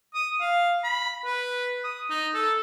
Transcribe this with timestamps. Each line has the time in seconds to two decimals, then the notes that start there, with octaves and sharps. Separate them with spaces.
0.14 D#6
0.40 F5
0.84 B5
1.25 B4
1.84 D#6
2.10 D#4
2.34 A4